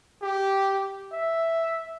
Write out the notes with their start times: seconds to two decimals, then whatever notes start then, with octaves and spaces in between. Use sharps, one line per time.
0.22 G4
1.12 E5